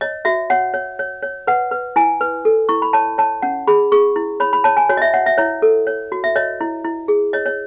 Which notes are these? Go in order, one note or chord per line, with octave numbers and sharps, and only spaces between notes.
C#5 D#5
F#4 E5
C#5 F#5
C#5
C#5
C#5
B4 F#5
B4
E4 G#5
B4
A4
E4 C#6
B5
C#5 A5
C#5 A5
C#4 F#5
G#4 B5
G#4 C#6
E4
C#5 B5
B5
C#5 A5
G#5
F#4 C#5
D#5
E5
C#5 F#5
E5
E4 C#5
A4
C#5
F#4
E5
C#5 D#5
E4
E4
G#4
C#5 D#5
C#5